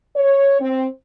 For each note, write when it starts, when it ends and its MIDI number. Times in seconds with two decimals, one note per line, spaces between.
0.16 0.60 73
0.60 0.87 60